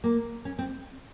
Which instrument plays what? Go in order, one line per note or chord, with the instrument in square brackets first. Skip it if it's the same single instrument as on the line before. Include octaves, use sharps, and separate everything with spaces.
[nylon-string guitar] A#3
C#4
C4